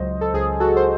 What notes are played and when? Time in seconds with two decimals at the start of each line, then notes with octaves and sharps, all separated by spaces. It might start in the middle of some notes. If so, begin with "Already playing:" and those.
Already playing: C#2 F#3 C5 D#5
0.21 A4
0.33 C#2 G#4
0.60 F#4 A4
0.76 C5